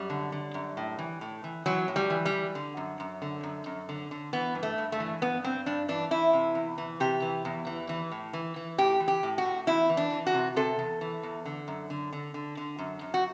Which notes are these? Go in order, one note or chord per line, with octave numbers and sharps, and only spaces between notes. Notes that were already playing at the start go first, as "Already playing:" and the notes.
Already playing: F#2 G3
D3
D3
F#2
A2
E3
A2
E3
E3 F#3
A2
G3
E3
G3
E3
D3
F#2
F#2
D3
F#2
F#2
D3
D3
E3 B3
G2
A3
G2
A3
E3
G2 B3
G2 C4
G2 D4
E3 D4
E3 E4
C3
E2
E3
C3 G4
E3
E2
E3
E3
A2
E3
E3
A2 G4
E3
G4
A2
F#4
A2
E2 E4
E3
D4
E3
F#4
C3
C3 A4
E2
E3
E2
D3
F#2
D3
D3
D3
D3
F#2
F#2
F#4